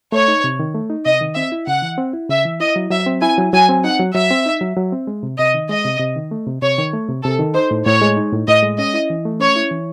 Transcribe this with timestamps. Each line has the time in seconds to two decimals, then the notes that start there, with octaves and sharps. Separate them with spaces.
0.12 A3 C#5
0.28 D#4
0.44 C3
0.60 D#3
0.75 A3
0.90 D#4
1.06 C3 D#5
1.21 D#3
1.36 C4 E5
1.52 E4
1.67 C#3 F#5
1.82 E3
1.98 C4
2.13 E4
2.30 C#3 E5
2.45 E3
2.60 E4 D#5
2.76 F#3
2.91 F#3 E5
3.07 C4
3.22 E4 G#5
3.38 F#3
3.53 F#3 G#5
3.69 C4
3.84 D#4 F#5
3.99 F#3
4.15 F#3 E5
4.31 C4
4.46 D#4
4.61 F#3
4.77 F#3
4.92 C4
5.07 G#3
5.23 C3
5.38 C3 D#5
5.54 D#3
5.69 G#3 D#5
5.85 C3
6.00 C3
6.16 D#3
6.31 A3
6.47 C3
6.62 C3 C#5
6.78 D#3
6.93 A3
7.09 C3
7.23 C3 A4
7.39 D#3
7.55 D#4 C5
7.71 A2
7.85 A2 C#5
8.01 G#3
8.17 D#4
8.33 A2
8.48 A2 D#5
8.63 G#3
8.78 C#4 D#5
8.94 E4
9.10 E3
9.25 A3
9.40 C#4 C#5
9.56 E4
9.71 E3